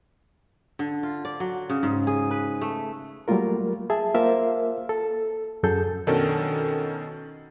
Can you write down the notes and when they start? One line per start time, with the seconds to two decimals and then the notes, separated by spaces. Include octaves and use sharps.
0.79 D3
1.03 F4
1.25 D5
1.40 F#3
1.70 C#3
1.83 G#2
2.07 G#4
2.31 B4
2.61 A3
3.28 F#3 G3 A3 A#3 F4 A#4
3.90 G#4 E5 A5
4.15 A#3 F4 A#4 C5 E5 F5
4.89 A4
5.63 F#2 F#3 G#4 A4 G6
6.07 B2 D#3 C#4 D4 A4 A#4